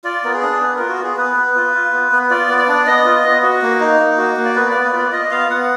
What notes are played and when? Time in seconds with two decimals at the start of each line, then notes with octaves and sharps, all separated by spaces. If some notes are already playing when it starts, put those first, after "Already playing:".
0.04 F4 D5
0.24 B3 A#4
0.33 G#4
0.42 D4
0.61 B3 B4
0.75 F4 A#4
0.89 F#4
0.98 B3 G#4
1.17 B3 B4
1.37 B3
1.55 F4
1.74 F4
1.92 B3
2.12 B3
2.30 F4 D5
2.49 B3
2.58 D5
2.68 D4
2.87 B3 D#5
3.06 F4
3.24 B3
3.42 F#4
3.62 A#3
3.80 D#4
4.00 A#3
4.18 F#4
4.37 A#3
4.45 D5
4.55 B3 B4
4.70 B3 D5
4.84 B4
4.93 F4 D5
5.12 F4 D#5
5.31 B3 F5
5.49 B3 F#5